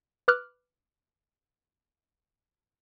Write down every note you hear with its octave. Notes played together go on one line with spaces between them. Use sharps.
B4 D6 F6 F#6